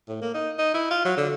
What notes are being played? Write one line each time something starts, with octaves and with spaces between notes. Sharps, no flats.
A2
A#3
D#4
D#4
E4
F4
F#3
D3